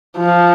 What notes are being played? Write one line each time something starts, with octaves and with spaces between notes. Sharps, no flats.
F3